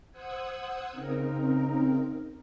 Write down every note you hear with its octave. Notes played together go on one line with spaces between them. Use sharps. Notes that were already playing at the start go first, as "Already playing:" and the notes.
C5 F#5 D#6 E6 F#6 G#6
C#3 C4 D#4 A#4